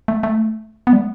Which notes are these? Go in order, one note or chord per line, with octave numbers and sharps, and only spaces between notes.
A3
A3
B3
G3
A3